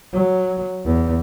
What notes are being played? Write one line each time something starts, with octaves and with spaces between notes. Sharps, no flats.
F#3
E2